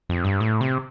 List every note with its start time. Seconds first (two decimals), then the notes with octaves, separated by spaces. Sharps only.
0.09 F2
0.24 G2
0.40 A2
0.61 C3